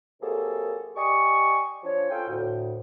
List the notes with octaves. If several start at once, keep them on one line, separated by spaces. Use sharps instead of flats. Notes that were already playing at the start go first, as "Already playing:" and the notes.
C3 F#3 A#3 G#4 A4
G4 D5 D#5 G#5 C#6
F3 D4 C#5
C#4 F4 A4 C5 G5
D2 A2